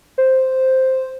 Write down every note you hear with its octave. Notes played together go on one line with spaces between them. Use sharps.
C5